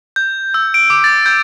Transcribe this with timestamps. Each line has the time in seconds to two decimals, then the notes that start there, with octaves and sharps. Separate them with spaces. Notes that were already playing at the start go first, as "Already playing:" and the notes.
0.16 G6
0.54 E6
0.74 D7
0.90 D6
1.04 A6
1.26 G6